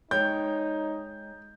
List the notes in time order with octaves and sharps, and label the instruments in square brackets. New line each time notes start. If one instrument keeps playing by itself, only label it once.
[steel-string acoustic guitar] G#3 C#5 G5 [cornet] D#4 [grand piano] G6